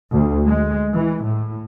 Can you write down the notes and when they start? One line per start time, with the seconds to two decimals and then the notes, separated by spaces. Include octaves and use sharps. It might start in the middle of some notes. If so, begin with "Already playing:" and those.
0.12 D2
0.46 G#3
0.94 E3
1.25 A2